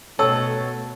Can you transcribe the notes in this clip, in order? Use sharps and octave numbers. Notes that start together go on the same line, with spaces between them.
B2 A3 C#4 A4 C#5 F#5 E6